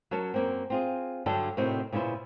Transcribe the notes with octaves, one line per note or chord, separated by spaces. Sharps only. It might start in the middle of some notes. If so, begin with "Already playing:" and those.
F#3 C#4 A#4 A5
F#2 A#3 C4
C4 F4 G#4
G2 D3 F#3 D4 A4 G5
A2 C3 C4 D#4 F#4 A#4
A#2 C#3 B3 E4 C5